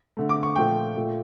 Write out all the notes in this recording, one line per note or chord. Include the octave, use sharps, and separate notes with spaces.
D3 A3
D6
C#6
A#2 F3 A3 G5
A#2 A3